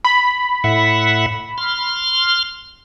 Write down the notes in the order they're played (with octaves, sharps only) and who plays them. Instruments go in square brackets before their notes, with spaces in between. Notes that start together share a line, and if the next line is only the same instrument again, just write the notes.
[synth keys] B5
[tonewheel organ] A2 E5 F#5
C6 F6